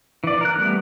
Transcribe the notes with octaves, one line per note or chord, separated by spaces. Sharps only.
E3 D5
A#4 F#6
G3 A3 B3